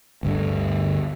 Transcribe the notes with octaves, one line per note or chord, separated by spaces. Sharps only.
G1 D2 G2 D3